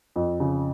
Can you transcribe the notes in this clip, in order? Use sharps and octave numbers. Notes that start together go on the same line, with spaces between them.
F2
C#3